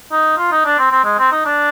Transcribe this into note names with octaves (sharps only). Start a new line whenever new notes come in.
D#4
F4
D#4
D4
C4
C4
G#3
C4
D#4
D4